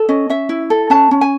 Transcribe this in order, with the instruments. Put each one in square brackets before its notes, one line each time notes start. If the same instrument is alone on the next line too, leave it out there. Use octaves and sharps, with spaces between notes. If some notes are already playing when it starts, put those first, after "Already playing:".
Already playing: [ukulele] A4
C#4 D#5
C#4 E5
E4
A4
C#4 A5
C#4
G#5